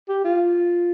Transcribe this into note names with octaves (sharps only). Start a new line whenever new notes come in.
G4
F4